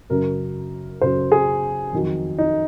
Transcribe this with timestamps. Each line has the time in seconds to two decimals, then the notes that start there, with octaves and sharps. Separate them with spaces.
0.10 F#2 C#3 F#3 A#4
1.01 F#2 C#3 F#3 C5
1.32 G#4
1.93 F2 D#3 F#3
2.38 D#4